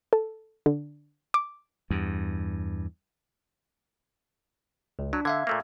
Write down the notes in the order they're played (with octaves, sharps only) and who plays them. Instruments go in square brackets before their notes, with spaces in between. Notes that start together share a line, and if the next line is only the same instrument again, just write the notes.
[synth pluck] A4
D3
D6
[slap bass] E2 G2
[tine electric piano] C#2
[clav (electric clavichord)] F#3 [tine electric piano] D4
[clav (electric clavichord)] D3 [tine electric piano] E5 F5 G#6
[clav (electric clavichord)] A#2 A3 A#3